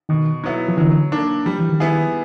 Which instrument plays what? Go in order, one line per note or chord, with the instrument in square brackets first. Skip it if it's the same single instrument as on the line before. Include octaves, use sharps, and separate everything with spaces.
[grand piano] B2 [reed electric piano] D#3
[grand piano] F#3 B3 E4
[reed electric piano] F3
[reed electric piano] D3 E3 [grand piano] F#3
[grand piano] A#3 D4
[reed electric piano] F3 [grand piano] G3
[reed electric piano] E3
D#3 F3
[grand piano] B3 E4 G#4